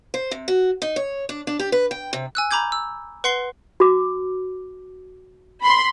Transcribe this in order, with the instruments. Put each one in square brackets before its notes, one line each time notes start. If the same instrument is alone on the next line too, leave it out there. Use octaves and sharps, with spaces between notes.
[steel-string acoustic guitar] C5
C3
F#4
D#4
C#5
D4
D4
G4
B4
G5
C3
[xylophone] G#5 E6 F#6
A#5 B5 D6 G6 G#6
E6
B4 F#5 C6 C7 G7
[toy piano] F#4 D6
[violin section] B5 C6